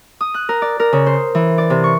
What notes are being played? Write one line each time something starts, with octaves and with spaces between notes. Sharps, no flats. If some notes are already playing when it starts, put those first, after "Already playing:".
D#6
F#6
A#4
D5
A#4
C#3
C5
E3
D5
C3
C#6